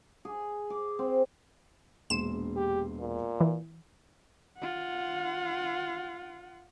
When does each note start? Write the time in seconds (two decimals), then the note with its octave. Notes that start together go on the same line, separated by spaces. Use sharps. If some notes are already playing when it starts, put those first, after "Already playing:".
0.25 G#4
0.70 D6
0.99 C4
2.10 E1 A#1 C6 E7
2.56 G4
3.00 A#2
3.40 E3
4.58 F4 F#5